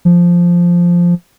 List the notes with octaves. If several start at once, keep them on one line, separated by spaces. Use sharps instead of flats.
F3